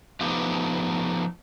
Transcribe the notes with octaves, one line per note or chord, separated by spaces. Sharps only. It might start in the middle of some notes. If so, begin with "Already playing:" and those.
F3 A3 B3 D#4 G4